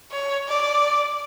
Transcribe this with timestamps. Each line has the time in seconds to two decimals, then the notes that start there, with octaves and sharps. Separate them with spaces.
0.12 C#5
0.47 D5